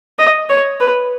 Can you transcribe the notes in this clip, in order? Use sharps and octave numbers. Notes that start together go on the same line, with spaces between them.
D#5
C#5
B4